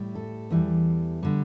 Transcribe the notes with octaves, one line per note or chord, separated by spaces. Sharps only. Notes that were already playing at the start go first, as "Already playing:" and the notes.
Already playing: A2 G3
A4
E2 E3 G3
D3 G3